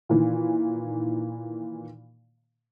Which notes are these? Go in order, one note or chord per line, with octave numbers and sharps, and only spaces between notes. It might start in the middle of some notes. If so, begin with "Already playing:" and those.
A#2 D#3 E3